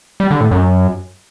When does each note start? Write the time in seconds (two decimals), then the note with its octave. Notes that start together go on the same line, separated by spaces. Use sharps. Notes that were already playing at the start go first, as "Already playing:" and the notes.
0.20 G3
0.31 D3
0.41 A2
0.51 F#2